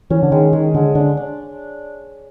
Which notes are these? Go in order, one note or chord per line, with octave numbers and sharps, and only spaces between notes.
E3 C#4
D3
D#3 G#3
D#3 G#3
D3 G#3
D3 D4
D4